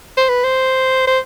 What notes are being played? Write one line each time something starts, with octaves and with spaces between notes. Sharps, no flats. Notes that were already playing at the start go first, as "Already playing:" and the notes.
C5
B4
C5
C5